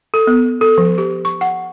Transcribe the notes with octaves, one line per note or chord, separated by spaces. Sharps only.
A4
B3
A4
F3
G4
C#6
F#5